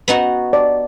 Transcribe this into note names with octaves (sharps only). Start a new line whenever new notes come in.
B3 D#4 F#4
D5